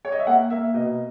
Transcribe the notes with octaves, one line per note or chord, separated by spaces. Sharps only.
C#5
D#5
E5
A#3 F#5
A#3 E5
B2 D#5